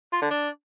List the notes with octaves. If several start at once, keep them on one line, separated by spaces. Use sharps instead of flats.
F4
D3
D4